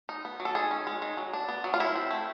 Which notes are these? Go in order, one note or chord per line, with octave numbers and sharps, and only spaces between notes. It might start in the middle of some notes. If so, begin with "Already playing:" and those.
D#4
B3
F#3
A4
D#3 G#4
C#4
G#3
D#3
F#3
D4
B3
F#3
F4
F#3 E4
C4
A3